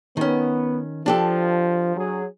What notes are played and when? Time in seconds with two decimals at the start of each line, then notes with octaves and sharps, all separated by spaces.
0.17 D#3 B3 C#4
1.06 F3 D4 G4 A4
1.97 F#3 G#4